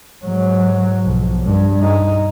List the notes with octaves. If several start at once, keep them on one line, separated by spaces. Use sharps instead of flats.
G#2 F#3
B1 F3
G2
D#4